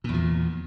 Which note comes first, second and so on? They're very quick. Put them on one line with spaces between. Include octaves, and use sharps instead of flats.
A#2 E2 F3